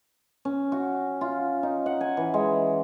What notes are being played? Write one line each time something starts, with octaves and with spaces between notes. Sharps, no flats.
C#4
F#4
F4
D#4
F#5
G#5
E3
G#3